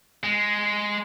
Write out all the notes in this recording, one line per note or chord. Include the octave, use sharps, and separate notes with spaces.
G#3